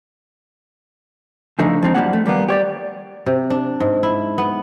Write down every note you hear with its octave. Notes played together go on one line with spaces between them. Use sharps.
C#3 F3 A3 D4 D#4
F3 G#3 C4 C#4 D#4
F#2 F3 G3 A#3 C#4 F#5
A3
D#2 G3 A#3 B3
G4 C#5 D5
C3
D4
G#2
E4
B3